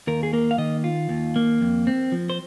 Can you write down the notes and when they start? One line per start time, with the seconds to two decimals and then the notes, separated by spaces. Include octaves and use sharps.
0.07 D#2 A#4
0.23 G#4
0.33 A#3 A#4
0.51 F5
0.58 D#3 D#5
0.84 F4
1.09 D#2
1.36 A#3
1.61 F2
1.87 C4
2.12 F3
2.30 C5